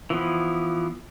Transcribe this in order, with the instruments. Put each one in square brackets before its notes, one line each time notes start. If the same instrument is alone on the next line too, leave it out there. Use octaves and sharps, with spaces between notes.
[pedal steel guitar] E3 F3 B3